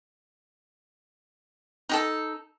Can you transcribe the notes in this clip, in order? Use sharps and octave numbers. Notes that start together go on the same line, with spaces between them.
D#4 G4 A4